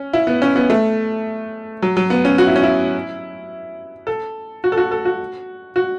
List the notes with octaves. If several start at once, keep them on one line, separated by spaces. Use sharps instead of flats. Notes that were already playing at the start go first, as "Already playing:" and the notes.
Already playing: C#4
E4
B3
C#4
B3
A3
F#3
F#3
B3
C#4
F#4
E4
C#4
E4
A4
F#4
A4
F#4
A4
F#4
F#4